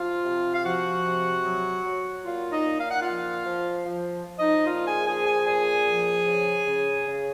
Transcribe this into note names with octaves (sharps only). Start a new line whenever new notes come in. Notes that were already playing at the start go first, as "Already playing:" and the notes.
Already playing: F3 F4 F5
C3
F5
F3 F#4 F#5
C3
F#3
F#3
A#2 F4 F5
D#4 D#5
A#2
F5
F#5
F3 F4 F5
F3
F3
F3
D#4 D#5
A#2 F4 F5
G#4 G#5
F3 G#4 G#5
G#4 G#5
A#2 G#4 G#5
F3
C#3
C#3
C#3